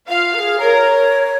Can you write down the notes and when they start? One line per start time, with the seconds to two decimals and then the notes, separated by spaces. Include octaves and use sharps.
0.09 F4 F5
0.34 A#4
0.39 G#4
0.59 A#4 C#5